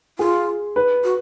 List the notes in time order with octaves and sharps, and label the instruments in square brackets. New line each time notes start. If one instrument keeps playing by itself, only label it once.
[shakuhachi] F4 [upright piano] G#4
[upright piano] B4
[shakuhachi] F#4